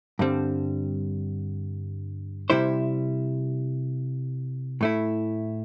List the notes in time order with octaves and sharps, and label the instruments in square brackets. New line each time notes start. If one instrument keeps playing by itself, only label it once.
[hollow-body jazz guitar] G2 D3 G3 C4
C3 G3 E4 C5
A2 A3 E4